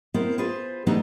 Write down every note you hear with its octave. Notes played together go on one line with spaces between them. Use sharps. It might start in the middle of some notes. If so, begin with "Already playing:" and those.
B3 C4 E4 A#4 C5
F4 G#4 B4 C5
E3 G3 A3 B3 D4 D#4